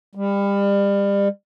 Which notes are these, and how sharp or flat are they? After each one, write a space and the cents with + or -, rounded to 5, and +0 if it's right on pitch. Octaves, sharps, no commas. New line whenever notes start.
G3 +30